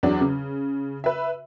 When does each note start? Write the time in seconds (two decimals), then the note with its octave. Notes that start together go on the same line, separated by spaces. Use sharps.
0.03 E2 F#3 D4
0.21 C#3
1.04 B4 E5